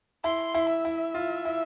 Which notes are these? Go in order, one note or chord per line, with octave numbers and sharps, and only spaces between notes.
E4 C6
E4
E5
E4
F4
E4